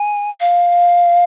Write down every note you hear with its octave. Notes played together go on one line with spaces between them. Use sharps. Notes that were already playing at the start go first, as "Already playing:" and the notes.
Already playing: G#5
F5